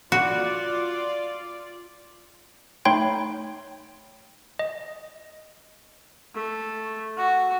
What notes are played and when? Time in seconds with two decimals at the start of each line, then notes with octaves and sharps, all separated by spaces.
0.12 F4 F#4 D5
2.85 A3 D#4 C#5 G5 B5 C6
4.59 D#5
6.35 A3
7.17 F#4